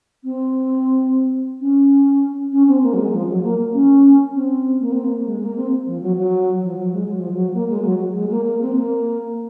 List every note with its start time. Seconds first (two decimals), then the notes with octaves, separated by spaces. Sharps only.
0.24 C4
1.61 C#4
2.52 C#4
2.68 C4
2.83 A#3
2.94 F#3
2.98 G#3
3.13 F3
3.29 F#3
3.43 A#3
3.74 C#4
4.35 C4
4.80 A#3
4.92 C4
5.04 A#3
5.26 G#3
5.41 A#3
5.56 C4
5.87 F3
6.02 F#3
6.17 F#3
6.63 F3
6.78 F#3
6.93 G#3
7.09 F#3
7.20 F3
7.32 F#3
7.54 A#3
7.69 G#3
7.84 F#3
8.00 F#3
8.15 G#3
8.30 A#3
8.45 A#3
8.61 C4
8.75 A#3